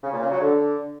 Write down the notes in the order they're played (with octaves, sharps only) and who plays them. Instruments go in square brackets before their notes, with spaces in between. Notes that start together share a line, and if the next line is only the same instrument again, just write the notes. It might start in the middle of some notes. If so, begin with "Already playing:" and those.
[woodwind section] C#3
A#2
C#3
F#3
D3